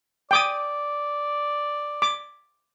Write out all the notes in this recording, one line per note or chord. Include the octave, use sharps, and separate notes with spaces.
D5 G5 D6 D#6
D6